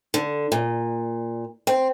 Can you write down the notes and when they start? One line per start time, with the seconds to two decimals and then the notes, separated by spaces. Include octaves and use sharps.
0.14 D3
0.52 A#2
1.67 C4